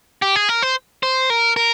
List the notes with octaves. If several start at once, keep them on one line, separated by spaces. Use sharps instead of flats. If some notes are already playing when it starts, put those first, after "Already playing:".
G4
G#4
A#4
C5
C5
A#4
A#4